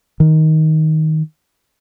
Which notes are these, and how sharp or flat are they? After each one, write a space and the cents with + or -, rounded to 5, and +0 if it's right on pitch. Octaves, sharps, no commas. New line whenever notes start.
D#3 +10